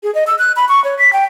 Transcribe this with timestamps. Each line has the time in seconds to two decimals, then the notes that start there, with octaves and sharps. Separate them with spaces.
0.03 G#4
0.15 D#5
0.27 E6
0.39 F#6
0.56 B5
0.69 C#6
0.84 C#5
0.99 B6
1.13 G5